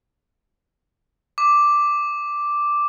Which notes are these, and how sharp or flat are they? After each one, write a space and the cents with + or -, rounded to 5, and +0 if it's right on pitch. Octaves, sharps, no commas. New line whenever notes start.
D6 +0